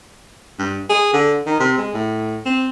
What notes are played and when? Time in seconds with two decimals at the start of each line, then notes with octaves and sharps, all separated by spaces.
0.59 G2
0.89 G#4
1.13 D3
1.46 D#3
1.60 C3
1.78 G#3
1.93 A2
2.45 C4